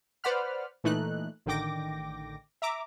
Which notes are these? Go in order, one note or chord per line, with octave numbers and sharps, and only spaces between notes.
B4 C5 D5 F#5 B5 F6
A#2 E3 A3 D#4 F#6
A1 D3 D#3 G5 D6 A#6
E5 A#5 D6